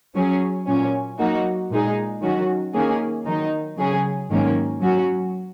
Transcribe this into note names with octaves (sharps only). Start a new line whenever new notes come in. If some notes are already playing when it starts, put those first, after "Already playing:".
F#3 C#4 G#4
A#2 F#3 C#4
F#3 A#3 D#4 F#4
A#2 G#3 D#4 G#4
D#3 F#3 C#4 F#4
D#3 A#3 C#4 G#4
D#3 F#3 D#4
C#3 F#3 C#4 G#4
G#2 D#3 F#3 A#3 C#4
F#3 C#4 F#4